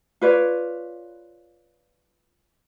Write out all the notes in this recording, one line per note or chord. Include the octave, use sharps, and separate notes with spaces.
F4 B4 C#5 D5